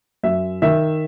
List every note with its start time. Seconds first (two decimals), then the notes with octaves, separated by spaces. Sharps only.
0.23 F#2 E5
0.62 D#3 E5